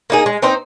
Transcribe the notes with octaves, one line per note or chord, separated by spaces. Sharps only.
A#3 D#4 G#4
G#3
C4 D#4 C5